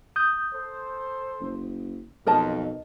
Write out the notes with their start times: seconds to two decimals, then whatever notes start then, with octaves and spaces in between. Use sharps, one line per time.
0.16 D#6 G6
0.53 A4 C5
1.40 F#1
2.27 B1 F2 A#4 D#5 A5